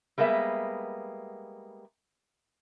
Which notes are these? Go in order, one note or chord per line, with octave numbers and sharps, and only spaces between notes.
G3 G#3 A#3 B3 E5